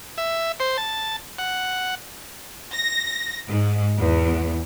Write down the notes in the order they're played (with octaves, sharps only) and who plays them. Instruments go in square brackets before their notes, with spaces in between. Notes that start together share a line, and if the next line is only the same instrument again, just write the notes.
[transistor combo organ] E5
C5
A5
F#5
[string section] A#6
G#2
E2